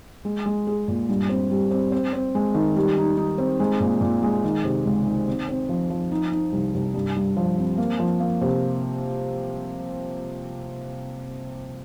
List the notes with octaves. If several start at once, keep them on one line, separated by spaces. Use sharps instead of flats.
G#3
G#3
G#4
A#2
G2
C4
G3
C4
C4
C4
G#3
D#3
G3
D#4
D#4
C4
G#3
A#2
A#2
G#3
D#3
C3
C#2
D#3
C4
C4
F3
F3
D#4
D#4
C2
C2
G2
G2
F3
C4
A#3
F3
A#3
C3